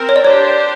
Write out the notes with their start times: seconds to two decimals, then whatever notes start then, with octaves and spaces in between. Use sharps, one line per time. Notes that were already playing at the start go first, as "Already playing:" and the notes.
Already playing: C4 A#4
0.09 C#5
0.16 D5
0.25 D4 G4 C5 C#5